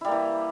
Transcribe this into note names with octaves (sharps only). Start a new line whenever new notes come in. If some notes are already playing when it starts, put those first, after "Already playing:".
E3 G3 A#3 E4